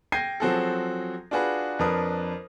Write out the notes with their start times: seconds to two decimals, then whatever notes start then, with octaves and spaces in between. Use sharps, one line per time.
0.12 G5 G6 G#6 A#6 C7 D#7
0.40 F3 F#3 C4 F#4 G#4 A4
1.31 D4 F4 F#4 G#4 B4
1.79 F2 D4 A#4 B4 D#6